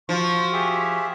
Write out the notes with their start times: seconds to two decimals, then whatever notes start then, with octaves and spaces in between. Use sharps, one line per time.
0.09 F3 F#4 C6 C#6
0.53 G4 G#4 E5